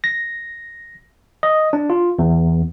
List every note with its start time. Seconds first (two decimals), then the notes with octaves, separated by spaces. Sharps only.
0.04 A#6
1.43 D#5
1.73 D4
1.90 F4
2.19 E2